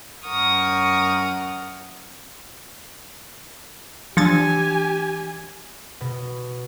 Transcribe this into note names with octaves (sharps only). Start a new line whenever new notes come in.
F#2 A#4 F#5 C#6 D#6 F6
E3 F3 D4 G4 G#5 G#6 A6
B2